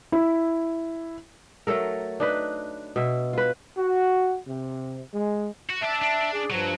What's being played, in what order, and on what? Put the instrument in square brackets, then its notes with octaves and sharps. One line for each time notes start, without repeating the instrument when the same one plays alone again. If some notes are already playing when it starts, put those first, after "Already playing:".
[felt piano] E4
[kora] F#3 A3 A4 A#4
D4 D#4 B4
B2 E5
F4 B4
[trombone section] F#4
C3
G#3
[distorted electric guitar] F#4
[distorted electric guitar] D4 D5 [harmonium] E5 A5
[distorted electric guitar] D4
[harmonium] G#4 D5
[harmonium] G2 F3 [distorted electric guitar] F#3